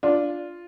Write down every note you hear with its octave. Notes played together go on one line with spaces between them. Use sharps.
D4 F4